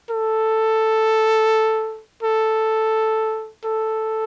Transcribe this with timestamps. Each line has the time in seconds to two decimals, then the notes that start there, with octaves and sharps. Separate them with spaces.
0.10 A4
2.23 A4
3.65 A4